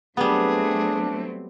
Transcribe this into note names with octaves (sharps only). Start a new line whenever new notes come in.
F#3 G3 A3 B3 C4 D4 G#4